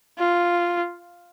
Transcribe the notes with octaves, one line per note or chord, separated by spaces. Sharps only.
F4